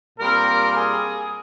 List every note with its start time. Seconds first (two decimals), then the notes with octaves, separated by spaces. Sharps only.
0.19 A#2 G3 C4 A#4
0.74 G#4